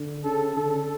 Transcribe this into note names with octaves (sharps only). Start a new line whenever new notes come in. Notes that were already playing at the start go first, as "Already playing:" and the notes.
Already playing: D3
C#3 A4
D3 A4